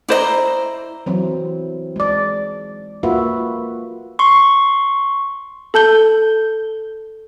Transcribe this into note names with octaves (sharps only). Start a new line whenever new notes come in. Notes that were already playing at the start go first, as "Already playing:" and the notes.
E4 C5 D5 D#5 A#5
E3 F#3 C4
G#3 D5
A#3 F4 F#4 B4 E5
C6 C#6
A4 A5 G6 G7